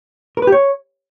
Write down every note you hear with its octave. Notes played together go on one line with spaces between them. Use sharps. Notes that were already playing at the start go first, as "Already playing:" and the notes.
A#4
B4
G4
C#5